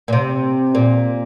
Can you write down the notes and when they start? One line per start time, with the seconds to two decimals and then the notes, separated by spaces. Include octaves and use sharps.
0.08 A#2
0.13 C3
0.75 A#2